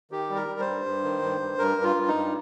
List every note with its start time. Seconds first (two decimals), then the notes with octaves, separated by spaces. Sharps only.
0.11 D#3 G4
0.30 G3
0.35 A#4
0.48 G3
0.60 C5
0.67 G2
0.86 G2
1.04 D#3
1.22 G2
1.40 G2
1.58 G2 A#4
1.77 G2
1.84 F4
1.96 G2
2.08 D#4
2.15 G2